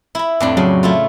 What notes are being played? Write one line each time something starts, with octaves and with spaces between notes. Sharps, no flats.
E4 B5
F2 A2 D4
C#3 F#3
A3 E4 F4